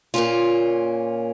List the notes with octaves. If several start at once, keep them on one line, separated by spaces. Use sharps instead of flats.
A#2 A#3 C#4 F4